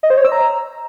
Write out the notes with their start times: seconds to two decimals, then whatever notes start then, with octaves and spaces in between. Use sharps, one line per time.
0.03 D#5
0.10 C5
0.17 C#5
0.25 E6
0.32 A#5